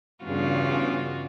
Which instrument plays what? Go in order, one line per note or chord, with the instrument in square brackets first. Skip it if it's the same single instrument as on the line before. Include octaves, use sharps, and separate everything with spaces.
[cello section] E2 G2 C#3 [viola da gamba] G3 F4 F#4